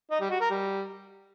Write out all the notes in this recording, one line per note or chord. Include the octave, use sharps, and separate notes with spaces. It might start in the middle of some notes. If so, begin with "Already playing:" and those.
D#4
G3
F#4
A#4
G3